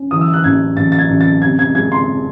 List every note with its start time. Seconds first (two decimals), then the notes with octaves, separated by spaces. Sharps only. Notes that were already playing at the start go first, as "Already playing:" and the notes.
Already playing: C#4
0.11 E3 D#6
0.21 E6
0.33 F#6
0.44 A1 G#6
0.77 A1 A6
0.92 A6
0.98 G#6
1.10 A1
1.21 A6
1.42 C3 G#6
1.59 G#6
1.75 G#3 G#6
1.92 C6